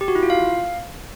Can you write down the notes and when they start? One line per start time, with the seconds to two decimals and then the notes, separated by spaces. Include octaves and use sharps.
0.01 G4
0.08 F#4
0.15 E4
0.23 F4
0.30 F5